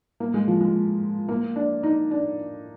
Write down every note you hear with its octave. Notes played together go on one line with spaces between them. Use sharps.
A#3
G#3
F3
G#3
A#3
D4
D#4
D4